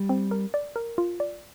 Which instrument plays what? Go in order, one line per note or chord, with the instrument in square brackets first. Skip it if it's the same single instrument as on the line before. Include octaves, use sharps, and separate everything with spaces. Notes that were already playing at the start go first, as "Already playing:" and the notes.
Already playing: [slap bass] G3
[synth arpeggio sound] C4
A#4
D5
A#4
F4
D5